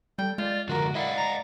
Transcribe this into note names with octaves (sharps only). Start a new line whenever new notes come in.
G3 A4 G5
G#3 F4 D5
F#2 D3 F3 F#4 A#4
E4 D5 D#5 F5 F#5
A#5